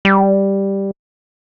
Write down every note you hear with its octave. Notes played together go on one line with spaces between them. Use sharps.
G3